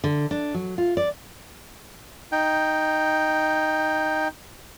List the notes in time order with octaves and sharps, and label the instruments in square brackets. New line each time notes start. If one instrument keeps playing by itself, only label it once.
[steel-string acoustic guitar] D3
D4
F#3
F4
D5
[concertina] D#4 G5